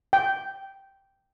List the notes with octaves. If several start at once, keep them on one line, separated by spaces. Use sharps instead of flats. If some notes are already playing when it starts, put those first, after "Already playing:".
G5